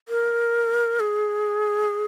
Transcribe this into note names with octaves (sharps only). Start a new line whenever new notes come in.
A#4
G#4